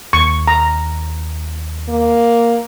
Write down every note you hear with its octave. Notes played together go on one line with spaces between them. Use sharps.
D#2 C#6
A#5
A#3